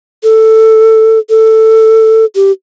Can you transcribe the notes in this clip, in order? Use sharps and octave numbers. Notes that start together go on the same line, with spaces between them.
A4
A4
G4